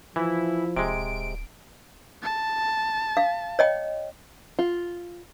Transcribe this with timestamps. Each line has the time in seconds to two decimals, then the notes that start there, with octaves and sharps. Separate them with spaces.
0.16 E3 F3 E4
0.77 D1 C3 G#3 D7
2.23 A5
3.17 F5
3.59 C#5 D#5 G5
4.59 F4